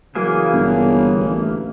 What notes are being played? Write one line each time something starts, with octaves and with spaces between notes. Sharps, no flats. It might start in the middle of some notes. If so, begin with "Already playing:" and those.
C#3 E3 F#3 A#3 G#4
G1
A1